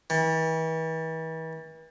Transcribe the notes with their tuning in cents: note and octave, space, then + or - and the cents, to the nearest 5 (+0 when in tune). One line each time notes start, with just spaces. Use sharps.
E3 -40